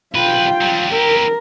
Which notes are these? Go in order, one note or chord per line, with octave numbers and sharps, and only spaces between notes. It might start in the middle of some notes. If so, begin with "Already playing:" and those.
B1 F4 B4 G5
F#3 G3
E4 G4 A#4